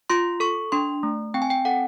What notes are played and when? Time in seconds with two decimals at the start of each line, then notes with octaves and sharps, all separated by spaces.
0.10 F4 C6
0.40 A4 C#6
0.72 D4 C6
1.03 A3
1.34 C4 G5
1.42 G#5
1.50 G5
1.65 A4 F#5